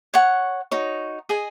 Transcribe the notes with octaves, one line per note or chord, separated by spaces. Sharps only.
C#5 F#5 C#6
D#4 F#4 C#5
G#4 D#5 G#5